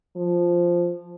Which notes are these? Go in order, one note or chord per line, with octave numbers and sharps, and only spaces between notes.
F3